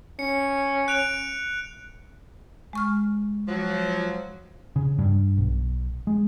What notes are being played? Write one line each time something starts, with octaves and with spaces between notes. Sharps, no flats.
C#4 C#7
F#6 D7 F7
G#3 C#6 F6
F3 F#3
C#3
G2
B1
G#3